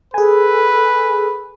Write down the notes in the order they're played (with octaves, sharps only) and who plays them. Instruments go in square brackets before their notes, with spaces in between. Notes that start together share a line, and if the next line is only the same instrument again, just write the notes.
[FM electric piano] G#4 G#5 [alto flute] A4 [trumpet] B4